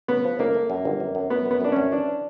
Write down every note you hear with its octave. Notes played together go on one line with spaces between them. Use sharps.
C#3 B3
F3
C#2 A#3
A3
F#2
G1
F#2
F#2
F#2 B3
F#2
B3
F#2 D4
F#2 C#4
E3 D4